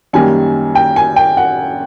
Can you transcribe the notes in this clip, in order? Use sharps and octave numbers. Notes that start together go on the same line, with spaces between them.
F#2 D#3 G3 A#3 G#5
G5
G#5
G5
F#5